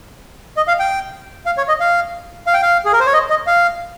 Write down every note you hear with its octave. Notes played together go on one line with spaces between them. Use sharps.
D#5
F5
G5
F5
C#5
D#5
F5
F5
G5
F5
G#4
A#4
C5
C#5
D#5
D#5
F5